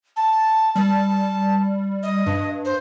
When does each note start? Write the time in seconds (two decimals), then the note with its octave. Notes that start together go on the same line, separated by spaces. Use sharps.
0.16 A5
0.75 G3 A5
2.03 D#5
2.26 G2
2.65 C5